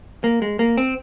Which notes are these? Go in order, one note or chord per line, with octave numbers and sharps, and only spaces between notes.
A#3
G#3
A#3
C4